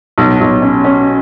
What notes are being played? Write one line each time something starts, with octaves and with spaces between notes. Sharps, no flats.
B1
B1
C#4
C#4